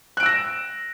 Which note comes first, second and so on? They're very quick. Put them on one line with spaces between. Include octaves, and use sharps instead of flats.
F#6 D7 E6 A#6 E7